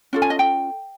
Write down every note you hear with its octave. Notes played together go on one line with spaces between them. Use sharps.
C#4 F4 A4
G#5
D#5
G5